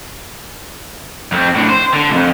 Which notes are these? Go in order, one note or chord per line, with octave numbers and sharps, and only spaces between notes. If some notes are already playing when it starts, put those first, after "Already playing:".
F2 C4
A2 D4
C5
D3
C2 F2